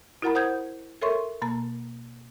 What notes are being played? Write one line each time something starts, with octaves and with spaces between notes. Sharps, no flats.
E4 F#4 A#4 F#5 A#5 B5
C5 F#5 D#6 G6 G#6
A4 A#4 C#5 E5 C6 C#6
B2 A#3 A#5